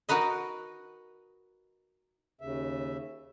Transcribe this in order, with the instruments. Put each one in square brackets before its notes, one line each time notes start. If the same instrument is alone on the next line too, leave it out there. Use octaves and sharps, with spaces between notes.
[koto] D#4 F#4 A#4 B4 D#5
[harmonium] D#2 C#3 E5